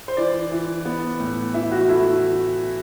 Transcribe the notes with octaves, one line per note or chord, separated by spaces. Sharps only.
C5
E3 D5
E3
B3
A2
E3 E5
E4
F#4
A3 E4